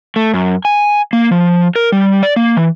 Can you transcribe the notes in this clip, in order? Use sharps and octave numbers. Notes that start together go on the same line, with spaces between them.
A3
F#2
G#5
A#3
F3
A#4
G3
D5
A#3
E3